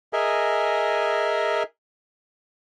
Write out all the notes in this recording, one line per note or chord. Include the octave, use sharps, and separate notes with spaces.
G#4 A#4 D#5 E5 G#5